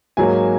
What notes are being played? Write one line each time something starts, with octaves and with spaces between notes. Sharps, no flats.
G#2 F#3 A#3 G#5